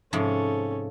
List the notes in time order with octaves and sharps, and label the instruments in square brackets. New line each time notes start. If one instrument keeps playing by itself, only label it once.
[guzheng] G#2 C3 F3 [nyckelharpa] C#4 A4